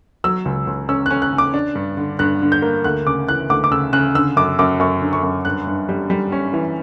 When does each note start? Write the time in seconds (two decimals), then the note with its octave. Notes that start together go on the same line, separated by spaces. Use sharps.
0.24 F#3 E6
0.45 C#2
0.67 C#2
0.89 C#4 E6
1.06 C#4 F#6
1.22 F#6
1.33 C#3
1.38 D6
1.54 D4
1.75 G2
1.97 D3
2.19 G2 F#6
2.42 D3
2.52 G6
2.62 A#3
2.84 D2 F#6
3.06 C#3 D6
3.28 E3 F#6
3.50 D2 D6
3.64 D6
3.71 C#3 E6
3.93 C#3 F#6
4.15 D3 E6
4.36 F#2 D6
4.59 F#2 D6
4.80 F#2 C#6
5.01 D3
5.13 C#6
5.23 F#2
5.45 G2 F#6
5.67 G2
5.89 G3
6.10 G3
6.32 C#4
6.53 E3